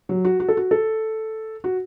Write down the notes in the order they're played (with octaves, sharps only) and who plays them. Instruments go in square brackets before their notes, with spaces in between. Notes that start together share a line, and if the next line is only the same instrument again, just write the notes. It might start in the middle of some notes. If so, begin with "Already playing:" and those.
[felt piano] F#3
F#4
F#4
A4
F#4
A4
F#4